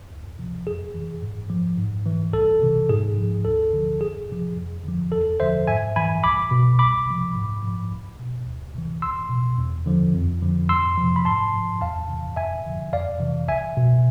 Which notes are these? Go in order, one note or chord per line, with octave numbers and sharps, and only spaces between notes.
D2
C3 F3
F2 G#4
E3
G#2
F3
G#2
E3
C2 A4
C3 E3
G#2 G#4
F3
D2 A4
D3 F3
C2 G#4
C3 F3
F2
D3 F3
E2 A4
D3 F3 C5 E5
G#2 E5 G#5
E3 G#5 B5
C2 B5 D6
B2
C2 B5 D6
C3 F3
G#2
F3
C2
B2
D2
C3 E3
C2 C6 E6
B2
E2
D3 F3
F2
D3 F3
F2 C6 E6
C3 F3
B5
G#2 A5 C6
F3
E2 F5 A5
C3 E3
F2 E5 G#5
D3 F3
F2 D5 F5
C3 E3
C2 E5 G#5
B2